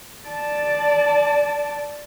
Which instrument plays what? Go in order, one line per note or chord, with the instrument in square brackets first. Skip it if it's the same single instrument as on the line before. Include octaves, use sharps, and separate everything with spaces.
[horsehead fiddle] D5 A5